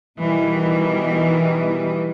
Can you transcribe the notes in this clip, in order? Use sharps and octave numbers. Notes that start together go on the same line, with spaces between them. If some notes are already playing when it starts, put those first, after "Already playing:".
B2 D#3 E3 G3